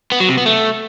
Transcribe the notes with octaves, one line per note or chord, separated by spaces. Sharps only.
B3
F#3
C3
B3
A3